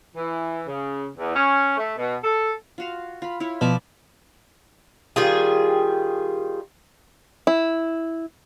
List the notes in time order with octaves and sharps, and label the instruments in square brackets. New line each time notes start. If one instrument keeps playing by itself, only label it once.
[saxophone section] E3
C#3
E2
C#4
A3
B2
A4
[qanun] F4 F#4 F5
F4 B5
E4 F4 C#5
[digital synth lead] B2 [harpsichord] F3 [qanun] D5 E5
[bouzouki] D#3 G3 F4 G#4
[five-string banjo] E4